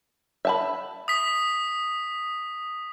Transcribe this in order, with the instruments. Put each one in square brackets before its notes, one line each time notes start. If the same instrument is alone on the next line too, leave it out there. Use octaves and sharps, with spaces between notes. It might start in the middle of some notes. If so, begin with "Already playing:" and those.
[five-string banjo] E5 A5 B5
[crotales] D#6 B6